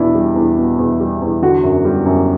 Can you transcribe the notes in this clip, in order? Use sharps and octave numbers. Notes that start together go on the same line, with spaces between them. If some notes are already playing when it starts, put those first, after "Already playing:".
Already playing: E2 B2 D4 E4
G3
E2
B2
E2
G3
E2
D3 F#4
F#2
G3
F#2